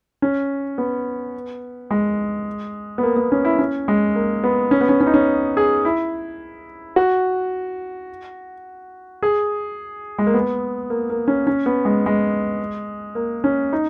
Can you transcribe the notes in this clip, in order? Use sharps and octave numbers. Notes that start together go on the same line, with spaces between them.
C#4
B3
G#3
B3
A#3
B3
C#4
E4
C#4
G#3
A#3
B3
C#4
B3
C#4
C#4
D#4
C#4
G#4
E4
F#4
G#4
G#3
A#3
B3
A#3
A#3
C#4
C#4
B3
G#3
G#3
A#3
C#4
D#4